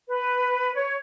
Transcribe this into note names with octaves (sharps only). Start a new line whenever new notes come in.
B4
C#5